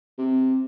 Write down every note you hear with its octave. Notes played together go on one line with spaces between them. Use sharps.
C3